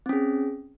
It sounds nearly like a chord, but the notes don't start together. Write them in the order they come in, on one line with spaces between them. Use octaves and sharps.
C4 C#4 G#4